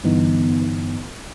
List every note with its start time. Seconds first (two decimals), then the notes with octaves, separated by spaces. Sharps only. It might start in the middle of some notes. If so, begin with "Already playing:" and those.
0.04 G2 D3 E3 B3 D#4